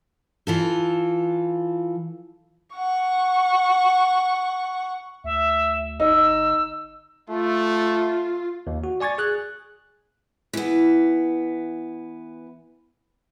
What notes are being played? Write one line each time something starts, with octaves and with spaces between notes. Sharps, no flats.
E3 F4 A4
F#5 C#6
D2 E5
G1 D#4 E6
A3 F4
D#2
F#4
D5 G#5 C#6 G#6 A6
G#4 F#6
E3 B3